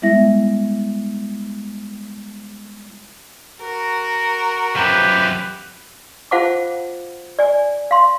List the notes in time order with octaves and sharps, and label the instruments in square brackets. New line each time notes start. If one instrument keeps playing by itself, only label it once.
[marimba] G3 G#3 B3 E4 E5 A#6
[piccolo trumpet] F#4 [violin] A#4
[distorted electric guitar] F#2 F3 [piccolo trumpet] G4 [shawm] B4
[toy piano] F4 C5 F5 F#5 A5 D6
D5 G#5
F5 C6